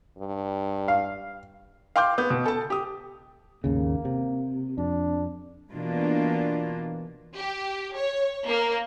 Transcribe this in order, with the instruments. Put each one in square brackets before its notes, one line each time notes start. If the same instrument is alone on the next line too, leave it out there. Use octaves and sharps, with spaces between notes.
[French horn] G2
[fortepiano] F5
[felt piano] F5 G5 C6 D6 G6
B3 G6
B2
A4 A5
G4 D#6
[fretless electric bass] G#1 D#2 C#3 [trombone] A#3
[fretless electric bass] C3
[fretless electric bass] F2 [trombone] D4
[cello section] B2 E3 A#3 D4 F4
[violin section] G4
C#5
A#3